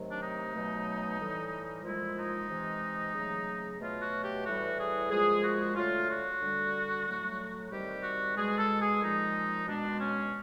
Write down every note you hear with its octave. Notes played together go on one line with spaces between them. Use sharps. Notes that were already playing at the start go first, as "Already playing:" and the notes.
Already playing: C3 D#3 F#3 A3
D4
D#4
B2 F#3 A3
A2 E3 G3
A#2 F3 G#3 E4
D#4
C3 E3 G#3
C#3 F#3 A3
B2 F#3 A3 F4
F#4
G4
A2 E3 G3 F#4
G#4
A#2 F3 G#3 G#4
F#4
D3 F#3 A3 F4
F#4
D3 G3
A2 F#3 A3
C3 D#3 G3 G4
F#4
B2 G#3 G#4
A4
G#4
A#2 F3 G#3 D#4
B2 G#3 D4
C#4